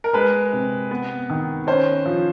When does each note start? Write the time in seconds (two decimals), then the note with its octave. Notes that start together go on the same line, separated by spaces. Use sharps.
0.04 A#4
0.13 G#3 B4
0.53 C3
0.91 B3
1.30 D#3
1.67 C#4 C5
2.06 F3